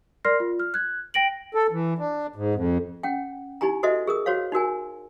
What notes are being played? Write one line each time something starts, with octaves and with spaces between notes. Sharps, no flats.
A#4 D5 C6 F6 A#6 C7
F4
F6
F#6 G#6
G5 A#6 D7 F#7
A4
E3
D4
G#2
F2
C#4 F#5 G5
D#4 E4 G4 G#5 A#5
F#4 A4 C5 D#5 E5
G#4 A#4 D#6
F#4 C5 C#5 F5
D#4 F#4 A#4 G#5